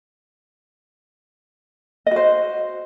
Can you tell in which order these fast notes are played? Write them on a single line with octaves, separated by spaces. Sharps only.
D#5 F#4 C5